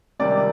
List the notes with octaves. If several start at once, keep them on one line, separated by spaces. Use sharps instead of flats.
C#2 C3 D#3 G3 D5